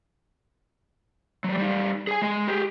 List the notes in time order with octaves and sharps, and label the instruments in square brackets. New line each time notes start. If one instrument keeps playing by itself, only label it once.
[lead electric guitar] F#3 G3
G3 D#4
G#4 G#5
G#3 D#5
G4 G#4